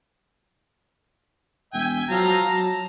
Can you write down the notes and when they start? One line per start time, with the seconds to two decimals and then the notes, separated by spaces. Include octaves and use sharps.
1.73 E1 E5 G5 G#5
2.10 F3 F#3 A4 F5 A#5
2.46 F#3 A5